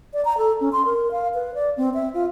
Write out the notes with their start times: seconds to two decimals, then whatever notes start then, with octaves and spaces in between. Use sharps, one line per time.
0.13 D5
0.25 A#5
0.38 A4
0.61 C#4
0.73 C6
0.85 A#4
1.11 F5
1.34 B4
1.55 D5
1.77 C4
1.94 E5
2.14 F4